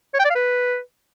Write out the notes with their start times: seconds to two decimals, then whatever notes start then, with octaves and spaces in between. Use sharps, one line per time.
0.14 C#5
0.19 G5
0.25 D5
0.30 F5
0.35 B4